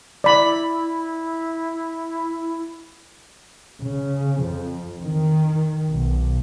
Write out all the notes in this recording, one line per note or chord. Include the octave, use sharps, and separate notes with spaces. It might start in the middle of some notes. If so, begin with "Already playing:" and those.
E4 D5 B5
C#3
F2
D#3
B1